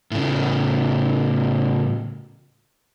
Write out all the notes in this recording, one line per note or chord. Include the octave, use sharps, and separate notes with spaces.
A2 C#3